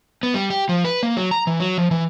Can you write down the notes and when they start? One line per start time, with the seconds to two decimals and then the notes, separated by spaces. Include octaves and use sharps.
0.23 B3
0.34 G3
0.50 G4
0.69 F3
0.85 B4
1.03 A#3
1.17 F#3
1.31 A#5
1.47 E3
1.60 F#3
1.78 F3
1.91 E3